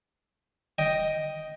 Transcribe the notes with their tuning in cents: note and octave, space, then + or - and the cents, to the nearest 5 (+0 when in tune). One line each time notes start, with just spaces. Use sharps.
D#5 +0 G5 +0